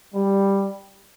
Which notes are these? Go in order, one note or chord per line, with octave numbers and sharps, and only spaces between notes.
G3